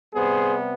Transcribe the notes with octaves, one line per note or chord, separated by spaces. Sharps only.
C3 G3 B3 G#4 C5